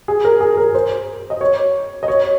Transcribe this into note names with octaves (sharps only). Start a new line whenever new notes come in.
G#4
A#4
G#4
A#4
C5
D#5
C#5
D#5
C#5